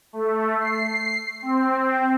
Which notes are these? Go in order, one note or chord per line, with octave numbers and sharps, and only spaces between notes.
A3
C7
C4